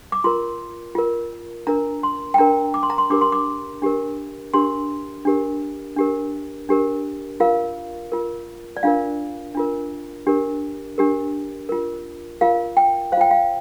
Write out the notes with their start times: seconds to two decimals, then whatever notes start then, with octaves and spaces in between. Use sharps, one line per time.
0.12 D6
0.24 F4 A#4 C6
0.95 F4 A#4
1.67 D4 A#4 A#5
2.03 C6
2.34 G5
2.38 D4 A#4 A#5
2.74 D6
2.83 C6
2.90 A#5
2.98 C6
3.10 D4 G4 A#4 D6
3.21 C6
3.32 D6
3.82 D4 G4 A#4
4.54 D4 G4 A#4 C6
5.25 D4 G4 A#4
5.96 D4 G4 A#4
6.69 D4 G4 A#4
7.40 F4 A#4 F5
8.12 F4 A#4
8.77 D5
8.83 D4 F4 A#4 F5
9.55 D4 F4 A#4
10.27 D4 G4 A#4
10.98 D4 G4 A#4
11.69 F4 A#4
12.41 F4 A#4 F5
12.77 G5
13.12 C5 F5
13.17 F4 G5
13.31 F5